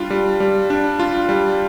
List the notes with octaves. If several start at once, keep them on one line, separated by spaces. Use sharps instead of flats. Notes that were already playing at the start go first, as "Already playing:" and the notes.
Already playing: G3 D4 F4
G3
G3
D4
F4
G3